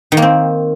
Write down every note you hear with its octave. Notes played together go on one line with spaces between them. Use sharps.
D#3
A#3
C4